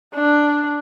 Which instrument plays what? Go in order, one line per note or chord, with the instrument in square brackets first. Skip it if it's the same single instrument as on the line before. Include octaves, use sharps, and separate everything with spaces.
[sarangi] D4